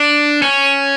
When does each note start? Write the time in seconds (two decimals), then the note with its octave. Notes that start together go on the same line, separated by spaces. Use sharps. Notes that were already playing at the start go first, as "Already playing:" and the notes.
Already playing: D4
0.42 C#4